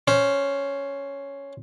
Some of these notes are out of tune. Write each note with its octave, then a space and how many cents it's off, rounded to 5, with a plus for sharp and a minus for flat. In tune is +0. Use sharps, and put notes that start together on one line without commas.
C#4 +5 C5 +10